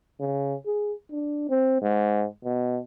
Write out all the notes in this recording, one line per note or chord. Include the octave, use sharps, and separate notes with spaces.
C#3
G#4
D4
C4
G#2
B2